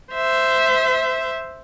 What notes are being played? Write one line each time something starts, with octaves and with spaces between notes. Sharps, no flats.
C5 E5